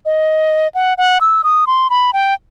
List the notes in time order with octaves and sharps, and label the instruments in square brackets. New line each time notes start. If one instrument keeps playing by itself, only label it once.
[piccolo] D#5
F#5
F#5
E6
D#6
C6
B5
G5